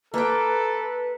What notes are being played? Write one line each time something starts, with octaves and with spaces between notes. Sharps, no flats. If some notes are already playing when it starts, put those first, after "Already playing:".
A#3 A4 B4 G5